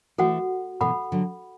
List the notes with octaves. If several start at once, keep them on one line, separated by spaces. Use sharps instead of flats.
E3 A3 F#4 A4 F#5
B2 E3 A4 F#5 B5
D3 F#3